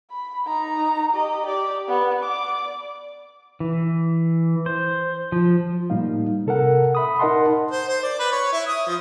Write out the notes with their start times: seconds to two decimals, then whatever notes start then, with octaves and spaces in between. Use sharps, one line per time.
0.11 B5
0.45 D#4 A#5
1.13 G4 D#5
1.46 G4 D5
1.88 B3
2.24 D5 D6
3.60 E3
4.66 C5
5.32 F3
5.90 A2 G3 A#3 D#4 F5
6.47 C3 A4 A#4 F#5
6.95 E5 B5 D#6
7.19 D#4 A#4 D#5 F#5 A5 C6
7.71 C5
7.88 C5
8.03 D5
8.19 B4
8.32 C#5
8.52 E4
8.67 D#6
8.87 F3